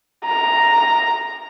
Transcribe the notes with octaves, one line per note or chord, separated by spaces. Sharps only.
A#5